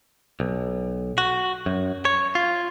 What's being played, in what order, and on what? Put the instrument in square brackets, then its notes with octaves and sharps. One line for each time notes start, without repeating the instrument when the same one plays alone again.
[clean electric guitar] B1
F#4
F#2
C#5
F4